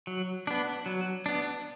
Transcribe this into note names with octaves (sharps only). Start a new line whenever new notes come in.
F#3
B3 D4
F#3
B3 D4